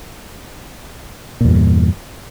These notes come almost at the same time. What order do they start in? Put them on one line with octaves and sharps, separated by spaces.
A#2 E2 G2